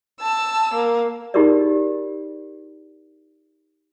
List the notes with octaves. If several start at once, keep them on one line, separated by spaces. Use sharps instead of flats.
A5 E6
A#3
D#4 F4 G4 G#4 A#4 D5